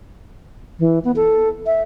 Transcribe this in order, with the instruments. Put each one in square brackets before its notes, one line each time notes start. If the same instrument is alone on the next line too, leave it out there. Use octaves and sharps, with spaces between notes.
[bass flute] E3
B3
A4
E5